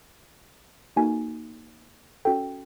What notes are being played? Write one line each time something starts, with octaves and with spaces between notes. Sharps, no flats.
A#3 D#4 F#4 A4 G#5
C#4 F#4 A4 G5